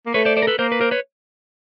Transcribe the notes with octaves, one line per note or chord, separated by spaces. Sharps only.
A#3
A3 B4 C#5
C5 D5
C5 D5
A#4
A4 B4
A#3 A#4 C5
B4
A#4 C5
B4 C#5